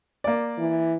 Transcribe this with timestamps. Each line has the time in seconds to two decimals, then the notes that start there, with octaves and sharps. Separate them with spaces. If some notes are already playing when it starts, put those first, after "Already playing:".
0.24 A#3 D5
0.58 E3